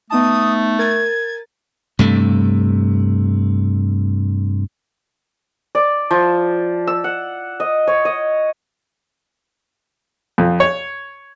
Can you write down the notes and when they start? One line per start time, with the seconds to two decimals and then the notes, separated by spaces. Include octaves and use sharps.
0.10 A3 B3 D#4 A5 D#6
0.79 A#4 G#6 A6
1.99 G2 C3 A3
5.75 D5
6.11 F3
6.87 E6
7.04 F#5
7.60 D#5
7.87 C#5
8.05 D#5
10.38 F2
10.60 C#5